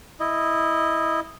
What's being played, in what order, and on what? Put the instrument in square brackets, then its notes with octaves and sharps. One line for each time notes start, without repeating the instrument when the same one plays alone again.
[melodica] E4 D#5